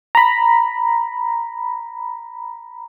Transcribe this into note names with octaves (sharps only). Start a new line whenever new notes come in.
A#5 B5